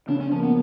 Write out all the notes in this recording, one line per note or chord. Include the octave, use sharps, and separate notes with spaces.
C#3 D4
C#4
F3 A#3 C#4
B3